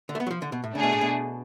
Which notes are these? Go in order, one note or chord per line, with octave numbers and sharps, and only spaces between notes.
D3
A3
B3
F#3
F3
D3
B2
A2
C#3 A3 D4 G#4
B2
A2
B2